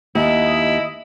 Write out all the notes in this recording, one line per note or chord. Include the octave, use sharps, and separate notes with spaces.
D#2 E4 D#5